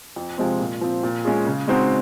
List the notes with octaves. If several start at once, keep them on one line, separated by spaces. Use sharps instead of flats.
F2
C3 F3 G#3 C4
A#2
F3 C4
A#2
G#3 C#4 F4 G#4
C#3
G#3 C4 D#4 F#4